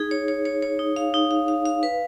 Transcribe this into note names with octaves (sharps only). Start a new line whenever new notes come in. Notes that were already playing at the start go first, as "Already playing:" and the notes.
Already playing: D#4 G#4
C#5
C#5
C#5
C#5
D#4
F5
D#4
F5
F5
F5
B4